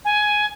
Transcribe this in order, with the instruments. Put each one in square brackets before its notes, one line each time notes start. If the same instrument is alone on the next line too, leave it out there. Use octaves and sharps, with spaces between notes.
[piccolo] G#5